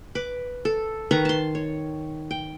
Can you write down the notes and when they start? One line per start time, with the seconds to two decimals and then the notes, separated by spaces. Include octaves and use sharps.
0.15 B4 D6
0.65 A4
1.11 D#3 B4 A#5 C#6
1.25 A5 C6
1.55 C#5
2.31 G5